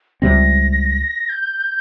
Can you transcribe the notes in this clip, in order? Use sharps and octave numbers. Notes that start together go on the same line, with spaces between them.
C#2 C3 G3 C4 A#6
G6